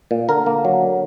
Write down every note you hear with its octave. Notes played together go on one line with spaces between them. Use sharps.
A#2
D3 A#4
A#3
F#3
D3